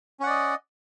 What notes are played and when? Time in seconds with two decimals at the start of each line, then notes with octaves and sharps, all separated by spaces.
0.20 C#4
0.23 F#5
0.26 D5
0.30 D#5